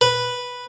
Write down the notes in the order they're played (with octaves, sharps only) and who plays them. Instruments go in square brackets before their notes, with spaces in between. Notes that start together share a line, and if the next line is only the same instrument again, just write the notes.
[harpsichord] B4